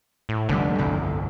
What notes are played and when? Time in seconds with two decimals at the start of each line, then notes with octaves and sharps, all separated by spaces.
0.29 A2
0.49 F1 D#2 D3 G3
0.78 G1 C2 F2